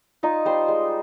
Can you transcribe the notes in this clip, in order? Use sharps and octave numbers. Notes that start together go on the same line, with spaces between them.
D#4 F4 D#5
G3 C5 C6
G#3